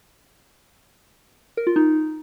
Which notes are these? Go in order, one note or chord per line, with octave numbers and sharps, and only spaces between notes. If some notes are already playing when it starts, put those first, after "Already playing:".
A#4
F4
D#4